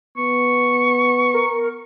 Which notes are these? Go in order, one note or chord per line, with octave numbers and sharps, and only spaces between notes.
B3 C#6
A#4